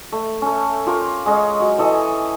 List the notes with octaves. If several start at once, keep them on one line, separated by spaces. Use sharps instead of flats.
A3
A3 C#4
F4 G4 A#4
G#3 C#4 D#5
F#3
E3 A4 D#5